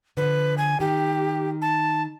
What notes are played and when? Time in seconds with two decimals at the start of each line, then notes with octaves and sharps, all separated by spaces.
0.17 D3 F3 B4
0.58 G#5
0.80 D#3 G4
1.62 A5